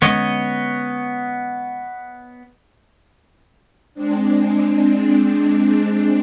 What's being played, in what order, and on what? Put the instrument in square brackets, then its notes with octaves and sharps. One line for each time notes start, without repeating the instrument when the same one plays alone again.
[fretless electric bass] D3 G#3 C#4 [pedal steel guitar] B3 C#5 D#5
[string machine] G#3 C4 D4